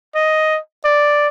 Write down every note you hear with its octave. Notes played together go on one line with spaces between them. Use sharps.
D#5
D5